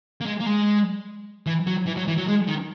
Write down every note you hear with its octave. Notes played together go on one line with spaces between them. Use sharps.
A#3
G#3
A#3
G#3
E3
F#3
E3
F#3
E3
F#3
G#3
D#3